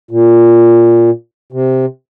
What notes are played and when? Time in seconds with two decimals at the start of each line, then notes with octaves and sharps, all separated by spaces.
0.11 A#2
1.52 C3